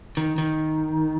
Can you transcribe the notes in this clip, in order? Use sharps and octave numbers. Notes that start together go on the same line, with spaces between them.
D#3
D#3